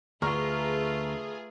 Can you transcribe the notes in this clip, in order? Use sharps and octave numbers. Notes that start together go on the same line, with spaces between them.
D2 A3 F4 G#4 B4 A#5 C#6 F6